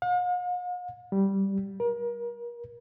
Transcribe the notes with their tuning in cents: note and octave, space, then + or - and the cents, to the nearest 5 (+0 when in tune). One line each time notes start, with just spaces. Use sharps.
F5 +45
G3 -5
A#4 +35